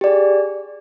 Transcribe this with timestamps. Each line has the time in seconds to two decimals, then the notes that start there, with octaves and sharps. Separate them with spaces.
0.01 G4
0.04 D5
0.07 G#4